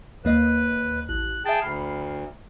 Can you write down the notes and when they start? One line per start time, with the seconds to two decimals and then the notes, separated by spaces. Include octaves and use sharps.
0.25 D#2 A#3 B4 D#5
1.09 A1 F#6
1.46 G#4 E5 G5 A5 A6
1.61 D2 B5 F6 C7